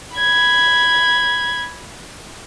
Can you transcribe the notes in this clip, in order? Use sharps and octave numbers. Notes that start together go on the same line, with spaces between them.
B5 G#6